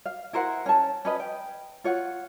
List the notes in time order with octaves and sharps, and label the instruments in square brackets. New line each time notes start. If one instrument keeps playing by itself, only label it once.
[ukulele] F5
E4 A#4 C5 F#5
C#4 A5
C#4 B4 D#5
G5
F4 C#5 F#5